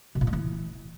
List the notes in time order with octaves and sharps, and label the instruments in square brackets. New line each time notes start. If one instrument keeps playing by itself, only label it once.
[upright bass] B2
A#2
A3
E3